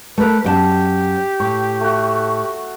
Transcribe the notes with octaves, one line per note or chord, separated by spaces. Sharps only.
A3 A#4 B4
F#2 G4 G5 A5
A2 C#6
A3 F#4